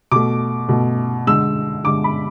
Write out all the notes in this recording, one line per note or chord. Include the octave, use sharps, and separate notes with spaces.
B2 A3 D6
B2 A3
D3 G#3 E6
D3 G#3 D6
B5